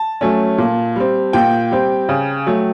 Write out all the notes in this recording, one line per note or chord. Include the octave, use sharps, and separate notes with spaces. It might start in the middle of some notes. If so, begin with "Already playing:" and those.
Already playing: A5
F#3 A3 C#4
A#2
G3 C4
A#2 G5
G3 C4
C#3
F#3 A3